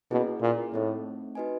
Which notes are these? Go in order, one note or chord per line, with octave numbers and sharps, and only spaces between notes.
B2 A#3 C#4 E4 G#4
A#2
A2 A3 C4 D#4
D#4 F#4 B4 D#5 G#5